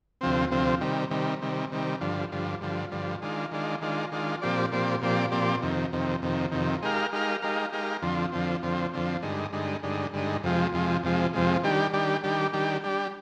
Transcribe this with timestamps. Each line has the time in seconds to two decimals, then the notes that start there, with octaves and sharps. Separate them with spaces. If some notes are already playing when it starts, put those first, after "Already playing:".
0.21 D2 C3 F3 C4
0.51 D2 C3 F3 C4
0.81 C3 D#3 G3
1.11 C3 D#3 G3
1.42 C3 D#3 G3
1.72 C3 D#3 G3
2.01 G2 D3 F3
2.32 G2 D3 F3
2.61 G2 D3 F3
2.91 G2 D3 F3
3.22 D#3 G#3 D4 F4
3.52 D#3 G#3 D4 F4
3.81 D#3 G#3 D4 F4
4.12 D#3 G#3 D4 F4
4.42 A#2 F3 C4 G4 D5
4.72 A#2 F3 C4 G4 D5
5.02 A#2 F3 C4 G4 D5
5.31 A#2 F3 C4 G4 D5
5.62 F2 C3 D#3
5.93 F2 C3 D#3
6.22 F2 C3 D#3
6.52 F2 C3 D#3
6.82 G#3 D#4 G4 A#4 F5
7.13 G#3 D#4 G4 A#4 F5
7.42 G#3 D#4 G4 A#4 F5
7.72 G#3 D#4 G4 A#4 F5
8.02 F2 D3 F3 C4
8.32 F2 D3 F3 C4
8.63 F2 D3 F3 C4
8.93 F2 D3 F3 C4
9.22 G2 D3 G#3 D#4
9.53 G2 D3 G#3 D#4
9.83 G2 D3 G#3 D#4
10.13 G2 D3 G#3 D#4
10.44 F2 C3 F3 G#3
10.73 F2 C3 F3 G#3
11.03 F2 C3 F3 G#3
11.33 F2 C3 F3 G#3
11.63 D#3 G3 D4 G4
11.93 D#3 G3 D4 G4
12.23 D#3 G3 D4 G4
12.53 D#3 G3 D4 G4
12.84 G3 D4 G4